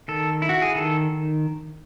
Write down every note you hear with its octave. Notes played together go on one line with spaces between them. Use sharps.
D#3 A4
E4
F#4
G#4
D#3 A4